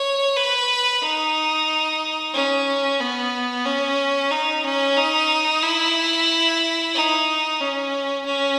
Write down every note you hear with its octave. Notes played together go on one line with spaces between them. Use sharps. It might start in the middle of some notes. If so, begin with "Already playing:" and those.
Already playing: C#5
B4
D#4
C#4
B3
C#4
D#4
C#4
D#4
E4
D#4
C#4
C#4